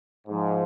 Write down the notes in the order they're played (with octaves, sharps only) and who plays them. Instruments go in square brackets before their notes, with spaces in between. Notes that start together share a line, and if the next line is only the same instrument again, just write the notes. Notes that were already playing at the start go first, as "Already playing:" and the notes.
[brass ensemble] G#2 F3